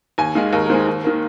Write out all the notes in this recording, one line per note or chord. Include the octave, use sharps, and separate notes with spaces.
D#2 G#5
D#3 G#3 F5
D#2 A#4
A#4
D#3 G#3 C5
D#2
D#3 A#3